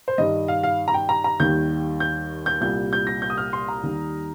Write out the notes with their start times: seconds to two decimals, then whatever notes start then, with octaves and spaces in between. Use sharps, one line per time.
0.08 C5
0.18 G2 D#3 G3 D#5
0.48 F5
0.63 F5
0.88 A#5
0.94 G5
1.09 A#5
1.24 A#5
1.40 D#2 D#3 G3 G6
2.00 G6
2.46 G6
2.61 C2 A#2 G3 G6
2.93 G6
3.07 A#6
3.22 G6
3.30 D#6
3.38 F6
3.53 C6
3.68 A#5
3.83 D#2 D#3 G3